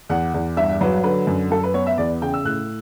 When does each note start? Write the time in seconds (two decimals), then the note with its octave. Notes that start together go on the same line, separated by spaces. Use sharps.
0.09 E2 F#5
0.34 E2
0.57 G2 E5
0.81 F#3 B4
1.04 D3 B4
1.27 F#2
1.51 F#2 A4
1.63 B4
1.74 B3 C#5
1.87 E5
1.98 E2 D5
2.22 C#3 G5
2.34 E6
2.45 A2 F#6